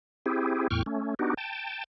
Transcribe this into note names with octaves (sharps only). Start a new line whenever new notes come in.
C4 E4 G4 G#4
E2 A2 G5 C#6 F6
A3 C#4
B3 D4 D#4 F#4 G4
G5 A5